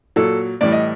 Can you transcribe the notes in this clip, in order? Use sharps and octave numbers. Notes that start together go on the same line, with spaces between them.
A#2 F#3 A4
A2 E3 G3 D5
D#5